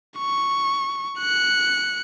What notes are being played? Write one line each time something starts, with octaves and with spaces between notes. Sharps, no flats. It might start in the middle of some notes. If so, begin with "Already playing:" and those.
C#6
F#6 C#7